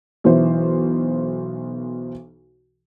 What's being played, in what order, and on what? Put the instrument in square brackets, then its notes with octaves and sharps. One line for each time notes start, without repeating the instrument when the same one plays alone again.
[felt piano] B1 E3 C5